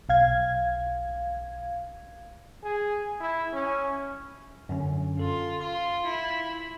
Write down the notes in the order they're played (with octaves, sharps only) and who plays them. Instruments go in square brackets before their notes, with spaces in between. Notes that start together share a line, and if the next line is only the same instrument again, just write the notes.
[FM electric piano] B1 F5 G#6
[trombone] G#4
E4
C#4
[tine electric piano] F#2 D3 C#4
[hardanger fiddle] F4 [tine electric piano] A4
[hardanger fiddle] F4 [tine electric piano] C6
[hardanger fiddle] E4